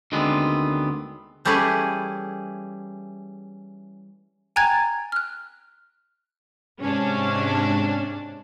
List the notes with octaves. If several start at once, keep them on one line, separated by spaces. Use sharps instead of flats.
D2 D#3 G#3 B3 C4 D4
E3 G3 A3 C#4 E4 G#4
G5 G#5 A#5 F#6 G#6 A6
F6 F#6
G#2 C3 C#4 D4